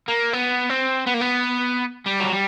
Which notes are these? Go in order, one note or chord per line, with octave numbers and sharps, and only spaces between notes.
A#3
B3
C4
B3
A#3
B3
G3
F#3
G3